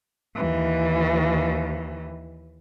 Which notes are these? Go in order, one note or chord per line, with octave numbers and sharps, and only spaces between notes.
D#2 E3